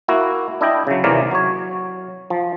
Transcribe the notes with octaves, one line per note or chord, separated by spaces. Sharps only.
A#3 E4 F#4
D4 E4 D#5 G5
C#3 F#3
D#2 C3 E3 A#4 D5 F5
F#3 C#5
F3